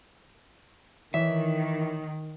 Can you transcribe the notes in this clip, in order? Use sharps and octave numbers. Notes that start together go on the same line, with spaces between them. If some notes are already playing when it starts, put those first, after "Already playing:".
D#3 E3 C#5 E5